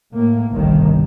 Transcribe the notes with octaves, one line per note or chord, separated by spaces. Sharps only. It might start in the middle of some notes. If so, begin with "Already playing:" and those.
A2 A#3
G1 C2 G2 C3 D#3